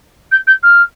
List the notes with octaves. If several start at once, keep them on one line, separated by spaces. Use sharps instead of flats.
G6
G6
F6